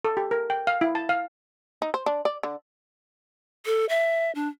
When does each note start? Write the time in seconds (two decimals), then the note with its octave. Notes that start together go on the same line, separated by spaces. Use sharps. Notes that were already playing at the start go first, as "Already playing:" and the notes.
0.05 A4
0.17 G4
0.31 A#4
0.50 G5
0.67 F5
0.81 E4
0.95 A5
1.09 F5
1.82 D#4
1.94 C5
2.06 D4
2.25 D5
2.43 D3
3.66 A4
3.89 E5
4.35 D4